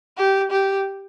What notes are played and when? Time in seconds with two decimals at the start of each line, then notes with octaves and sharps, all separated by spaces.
0.17 G4
0.51 G4